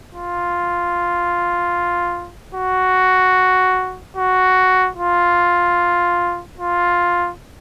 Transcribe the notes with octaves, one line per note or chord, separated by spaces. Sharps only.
F4
F#4
F#4
F4
F4